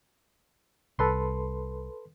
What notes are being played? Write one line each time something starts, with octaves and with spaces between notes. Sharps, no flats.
C2 A4 B4 C6